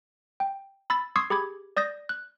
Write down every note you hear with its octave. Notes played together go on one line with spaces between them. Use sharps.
G5
B5 E6 A6
C6 C#6 D#6 E6 G#6 C7
G4 G#4 B5 D6 G#6
D5 D#6 G6 A#6
F#6